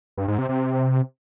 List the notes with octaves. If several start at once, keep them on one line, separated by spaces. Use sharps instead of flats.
G2
G#2
C3
C3